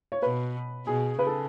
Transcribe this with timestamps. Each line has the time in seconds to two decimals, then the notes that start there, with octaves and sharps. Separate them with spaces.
0.12 C#5
0.22 B2 B4
0.86 B2 G#4
1.18 C#3 B4
1.27 A4